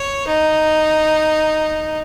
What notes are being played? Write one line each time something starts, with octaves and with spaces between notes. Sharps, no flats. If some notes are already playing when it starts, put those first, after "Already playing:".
Already playing: C#5
D#4